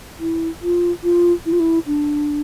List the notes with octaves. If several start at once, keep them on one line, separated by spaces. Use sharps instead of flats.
E4
F4
F4
E4
F4
E4
D4